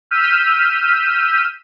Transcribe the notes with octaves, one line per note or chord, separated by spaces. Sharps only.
E6 F6 G6 B6 D#7 E7